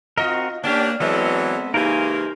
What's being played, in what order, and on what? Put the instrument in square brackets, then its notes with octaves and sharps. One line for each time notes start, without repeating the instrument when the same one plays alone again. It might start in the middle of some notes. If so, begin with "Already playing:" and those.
[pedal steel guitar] C4 F#4 A#4 [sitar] F4 D#5 [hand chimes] F6
[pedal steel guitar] A#3 [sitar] B3 C#4 G4 [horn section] D4 [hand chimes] D5 F6
[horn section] E3 F#3 [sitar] G#3 [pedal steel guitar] B3 C4 A4
[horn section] C#3 E3 A#3 [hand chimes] D#4 G4 [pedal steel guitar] A#4 C5 G#5